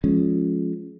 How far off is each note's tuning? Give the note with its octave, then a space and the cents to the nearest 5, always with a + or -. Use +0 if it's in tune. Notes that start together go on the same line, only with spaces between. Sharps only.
F3 +0 G#3 +20 C#4 +0